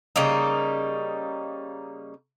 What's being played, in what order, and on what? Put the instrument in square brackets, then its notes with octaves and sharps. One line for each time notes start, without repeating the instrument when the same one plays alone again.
[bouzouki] C#3 G3 A#3 D#4